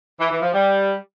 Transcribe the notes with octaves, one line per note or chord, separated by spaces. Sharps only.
E3
E3
F3
G3